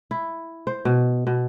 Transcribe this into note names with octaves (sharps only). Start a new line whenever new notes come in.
E4
C5
B2
B2